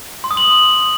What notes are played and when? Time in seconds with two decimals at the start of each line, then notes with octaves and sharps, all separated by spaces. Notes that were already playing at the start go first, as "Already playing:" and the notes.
0.24 C6
0.31 D#6
0.37 F#7